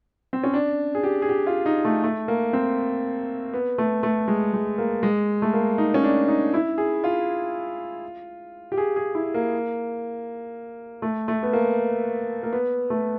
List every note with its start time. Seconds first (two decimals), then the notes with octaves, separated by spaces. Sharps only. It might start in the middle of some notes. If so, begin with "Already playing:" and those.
0.33 C4
0.44 C#4
0.54 D4
0.95 G#4
1.03 G4
1.22 G#4
1.29 G4
1.47 F4
1.66 D#4
1.85 A3
2.04 A3
2.28 A#3
2.53 C4
3.53 B3
3.78 A3
4.03 A3
4.28 G#3
4.54 G#3
4.78 A#3
5.03 G#3
5.42 A3
5.53 A#3
5.78 D#4
5.94 C#4
6.04 D4
6.28 D#4
6.54 E4
6.78 G#4
7.04 F4
8.72 G4
8.78 G#4
8.96 G#4
9.15 E4
9.34 A#3
11.02 A3
11.28 A3
11.43 B3
11.53 A#3
12.43 A#3
12.53 B3
12.90 A3